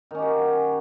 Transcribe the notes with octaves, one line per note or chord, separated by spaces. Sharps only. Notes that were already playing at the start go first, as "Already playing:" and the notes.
D#3 C#4 F#4 G4